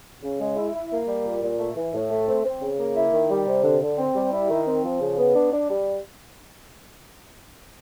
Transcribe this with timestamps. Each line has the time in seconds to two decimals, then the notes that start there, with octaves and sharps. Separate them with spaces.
0.23 C#3
0.40 G#3
0.57 E4
0.74 E4
0.91 A#3
1.08 G3
1.25 A#2
1.42 A#2
1.59 A3
1.76 E3
1.94 A2
2.10 A3
2.28 C4
2.44 C4
2.62 C#3
2.79 A#3
2.96 E4
3.13 D#3
3.30 G3
3.47 C3
3.64 D3
3.81 D3
3.98 C4
4.15 G3
4.32 E4
4.50 D#3
4.67 C4
4.84 F3
5.01 C#3
5.18 B3
5.35 D4
5.52 D4
5.69 G3